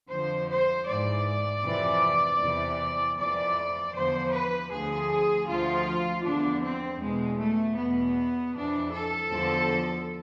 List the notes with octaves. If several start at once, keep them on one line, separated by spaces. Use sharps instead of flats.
F2 D3 F3 C5
C5
G#2 E3 D5
F2 C3 E3
E2 C3 E3
F2 E3 D5
E2 D3 F3 C5
B4
D2 D3 F3 G#4
D2 D3 F3 F4
E2 D3 F3 D4
C4
E2 B2 G#3
A3
E2 B2 B3
F2 E3 D4
A4
E2 D3 F3